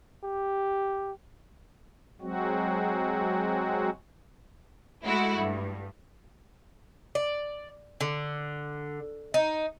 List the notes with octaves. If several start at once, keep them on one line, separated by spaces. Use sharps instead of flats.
G4
F#3 G#3 C4 F#4
G#3 A3 E4 F#4
G2
D5
D3
D#4